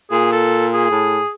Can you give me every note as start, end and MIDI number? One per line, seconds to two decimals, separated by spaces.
0.11 0.89 46
0.11 0.30 68
0.32 0.67 69
0.74 1.30 68
0.91 1.20 45